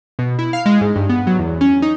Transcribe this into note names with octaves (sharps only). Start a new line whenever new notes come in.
B2
E4
F5
G#3
G#2
G2
B3
F#3
E2
C#4
D#4